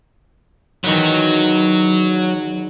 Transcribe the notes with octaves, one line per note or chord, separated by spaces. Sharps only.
E2 D#3 F#3 B4